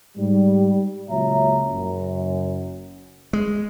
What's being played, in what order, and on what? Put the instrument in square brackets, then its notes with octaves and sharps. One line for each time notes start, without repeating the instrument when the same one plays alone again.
[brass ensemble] G#2 G3
C#2 A#2 F#3 E5 A#5
F#1 F#2
[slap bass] G#3